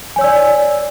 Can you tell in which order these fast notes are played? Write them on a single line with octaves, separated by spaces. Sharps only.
G#5 C#5 E6 D5